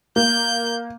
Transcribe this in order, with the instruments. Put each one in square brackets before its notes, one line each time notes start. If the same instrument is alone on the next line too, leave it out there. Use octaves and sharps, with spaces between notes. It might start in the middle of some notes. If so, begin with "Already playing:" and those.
[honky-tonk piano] A#3 [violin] G6